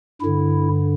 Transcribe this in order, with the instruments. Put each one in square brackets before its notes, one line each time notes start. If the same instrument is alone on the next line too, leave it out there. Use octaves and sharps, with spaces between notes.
[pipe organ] G2 D3 E4